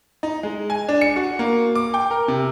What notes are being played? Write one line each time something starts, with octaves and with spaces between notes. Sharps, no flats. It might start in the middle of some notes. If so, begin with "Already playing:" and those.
D#4
G#3
G#5
D4
C#7
F#4
A#3
D6
G5
A#4
C3